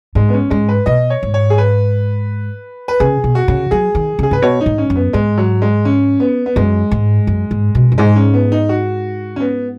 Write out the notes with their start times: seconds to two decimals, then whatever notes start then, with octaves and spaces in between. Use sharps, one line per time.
0.15 G#2 G#3
0.29 B3
0.34 C#4
0.50 G#2 G#3
0.69 B4
0.86 B2 D#5
1.10 C#5
1.23 G#2
1.34 C#5
1.50 G#4
1.58 B4
2.88 B4
3.00 C#3 G#4
3.24 B2
3.35 F#4
3.48 C#3
3.71 F#3 G#4
3.95 D#3
4.19 C#3 G#4
4.31 G#2 B4
4.42 B2 C#5
4.61 D#4
4.66 G#2
4.78 C#4
4.90 F#2
4.96 B3
5.13 G#2 G#3
5.38 F#3
5.62 G#3
5.85 C#4
6.20 B3
6.46 B3
6.56 F#2 G#3
6.91 G#2
7.27 F#2
7.51 G#2
7.75 B2
7.92 F#2
7.98 G#2 G#3
8.16 C#4
8.34 B3
8.52 D#4
8.69 F#4
9.36 C#4
9.40 B3